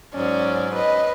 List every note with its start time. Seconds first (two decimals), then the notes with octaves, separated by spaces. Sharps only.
0.15 G#2 F#3 C#4 D5
0.75 B4 D#5